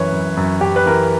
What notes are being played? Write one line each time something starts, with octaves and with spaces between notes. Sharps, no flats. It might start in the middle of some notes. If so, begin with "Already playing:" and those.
Already playing: F#2 E3 B4 C#5
F#2
F#2
F#2 G4
B4
E3 A#4